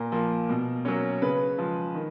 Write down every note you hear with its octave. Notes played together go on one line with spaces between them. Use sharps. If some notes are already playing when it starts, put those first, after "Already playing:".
Already playing: A#2 A#4
F3 A#3
B2
F#3 A#3 C#4
C#3 B4
F3 G#3
D#3